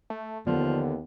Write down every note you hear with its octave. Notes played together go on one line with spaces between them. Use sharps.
A3
D#2 D3 F3 B3